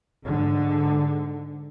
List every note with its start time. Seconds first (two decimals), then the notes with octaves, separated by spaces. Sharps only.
0.24 G#2 D3